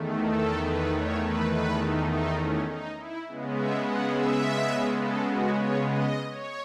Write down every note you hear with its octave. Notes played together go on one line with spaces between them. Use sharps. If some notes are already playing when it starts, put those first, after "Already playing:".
Already playing: E2 D#3 A3
A4
B4
C#5
B4
B4
D#4
D#4
C#4
D#4
E4
C#3 G#3 B3
E5
F#5
E5
A4
F#4
C#5
D#5
C#5